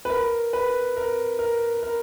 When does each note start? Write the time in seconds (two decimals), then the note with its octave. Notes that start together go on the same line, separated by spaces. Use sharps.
0.05 B4
0.10 A#4
0.53 B4
0.97 A#4
1.39 A#4
1.83 A#4